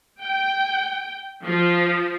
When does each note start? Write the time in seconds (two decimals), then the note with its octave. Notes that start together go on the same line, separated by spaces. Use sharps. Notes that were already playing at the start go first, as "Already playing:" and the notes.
0.23 G5
1.44 F3